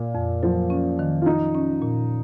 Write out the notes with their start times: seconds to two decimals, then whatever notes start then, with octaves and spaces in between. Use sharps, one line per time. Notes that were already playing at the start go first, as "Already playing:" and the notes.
Already playing: A#2
0.15 F2
0.43 F3 F#3
0.70 C#4
0.99 D#3
1.22 F4
1.26 F3 D#4
1.54 C#4
1.82 A#2